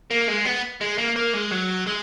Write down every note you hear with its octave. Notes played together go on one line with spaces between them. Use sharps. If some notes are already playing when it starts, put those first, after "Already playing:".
A#3
G#3
B3
G#3
A#3
A#3
G#3
F#3
G#3